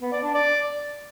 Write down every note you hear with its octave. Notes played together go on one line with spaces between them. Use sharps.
B3
D5
D4
D5